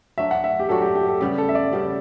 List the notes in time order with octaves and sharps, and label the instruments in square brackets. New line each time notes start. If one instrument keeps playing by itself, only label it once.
[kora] F#3 A3 D4 F#4 [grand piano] E5
[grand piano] F#5
E5
G4
[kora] F#3 A3 D4 F#4 [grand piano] A4
[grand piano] G4
G4
A4
[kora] C#3 G3 B3 [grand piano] G4
[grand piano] A4
E5
D5
[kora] C#3 G3 B3